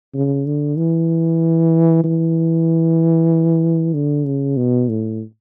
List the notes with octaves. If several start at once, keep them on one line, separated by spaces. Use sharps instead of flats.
C#3
D3
E3
E3
D3
C#3
B2
A2